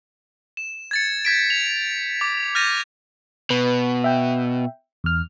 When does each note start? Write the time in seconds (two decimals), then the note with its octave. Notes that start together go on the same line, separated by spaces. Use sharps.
0.57 E7
0.91 G#6 A6 C#7
1.25 G6 G#6 B6 D7
1.50 F7
2.21 D6
2.55 F6 G6 A6 A#6 D#7
3.50 B2 B4
4.04 E5 G5
5.04 E2 F6